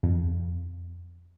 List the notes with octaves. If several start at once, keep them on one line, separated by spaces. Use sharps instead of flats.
F2